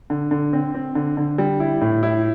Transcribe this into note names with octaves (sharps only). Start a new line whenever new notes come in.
D3
D3
C4
C4
D3
D3
G3
E4
A2
E4